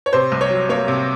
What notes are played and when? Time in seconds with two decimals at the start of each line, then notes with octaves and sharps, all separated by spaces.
0.06 C#5
0.13 C3 C5
0.32 C2
0.41 C#5
0.51 F#3
0.69 A#3 C#5
0.88 C3